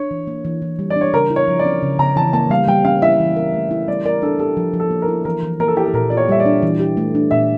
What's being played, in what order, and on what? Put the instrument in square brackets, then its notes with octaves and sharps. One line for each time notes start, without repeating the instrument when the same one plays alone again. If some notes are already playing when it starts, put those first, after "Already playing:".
Already playing: [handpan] D4 [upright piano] C#5
[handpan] E3
A#3
E3
E3
G3
[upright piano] D5
[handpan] D4
[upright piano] C#5
[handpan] C#3 [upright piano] A#4
[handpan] E4
[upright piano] C#5
[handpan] F3
[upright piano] D5
[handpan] C#4
C#3
[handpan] C#3 [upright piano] A#5
[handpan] E3 [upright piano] A5
[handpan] A#3 [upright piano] A5
[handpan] G3 [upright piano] F5
[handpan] G3 [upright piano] G5
[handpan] C#4 [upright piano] F5
[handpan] E4 [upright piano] E5
[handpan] E3
A#4
A3
E4
[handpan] G3 [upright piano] D5
[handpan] A#4 [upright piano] D5
[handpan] D4 [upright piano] A4
[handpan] G4 [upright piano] A4
[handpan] F3
F3
[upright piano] A4
[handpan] A#3
[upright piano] A#4
[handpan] E4
[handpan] E3 [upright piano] A#4
[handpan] E3
[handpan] A#3 [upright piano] A#4
[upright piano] A4
[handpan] E4 [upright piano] G4
[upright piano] A4
[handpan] A#2 [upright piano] A#4
[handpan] F4 [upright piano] D5
[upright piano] C#5
[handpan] G3 [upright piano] E5
[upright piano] D5
[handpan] D4
E3
G4
A3
D4
[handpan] A#2 [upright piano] E5